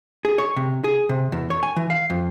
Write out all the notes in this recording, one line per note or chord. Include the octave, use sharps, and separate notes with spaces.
G#4
C#5
C3
G#4
C3
E2
C#5
G#5
E3
F5
F2